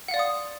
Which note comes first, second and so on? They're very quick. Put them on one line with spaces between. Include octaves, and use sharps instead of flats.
F#5 F5 D5 C6 D#6